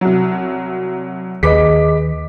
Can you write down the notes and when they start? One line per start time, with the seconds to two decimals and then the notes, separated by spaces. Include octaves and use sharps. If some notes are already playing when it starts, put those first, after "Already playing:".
0.01 C2 F#3
1.43 D#2 G#4 B4 D#5 D6 B6